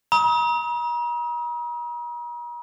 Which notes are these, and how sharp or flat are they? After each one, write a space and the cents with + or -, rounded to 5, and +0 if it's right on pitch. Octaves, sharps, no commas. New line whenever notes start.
A#5 +45 D#6 +40